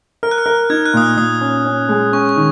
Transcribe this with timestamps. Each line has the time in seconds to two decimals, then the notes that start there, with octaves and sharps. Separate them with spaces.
0.23 A#4 F6
0.31 F#6
0.38 F6
0.46 A#4
0.70 D#4 G#6
0.86 F#6
0.94 A#2 D#6
1.02 F6
1.17 A#2 D#6
1.41 C#4
1.65 C#4
1.89 G#3
2.13 C#4 C#6
2.29 C#6
2.36 D#3